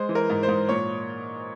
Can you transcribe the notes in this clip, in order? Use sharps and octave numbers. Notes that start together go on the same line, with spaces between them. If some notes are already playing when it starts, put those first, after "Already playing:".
Already playing: G#3 C5
E3
A#4
G#2
C5
G#2
A#2 C#5